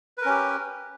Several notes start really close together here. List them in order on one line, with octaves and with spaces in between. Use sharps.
B4 A#4 C#4 G4